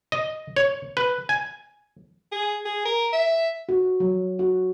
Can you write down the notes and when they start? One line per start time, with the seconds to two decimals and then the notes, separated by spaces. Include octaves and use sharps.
0.12 D#5
0.56 C#5
0.97 B4
1.29 G#5
2.32 G#4
2.65 G#4
2.85 A#4
3.13 E5
3.69 F#4
4.00 F#3
4.39 F#4